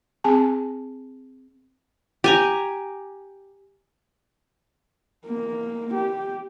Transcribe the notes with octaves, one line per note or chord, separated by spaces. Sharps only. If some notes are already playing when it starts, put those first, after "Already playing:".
C4 G#4 G#5 A5
G4 G#5 A#5
A#3
G4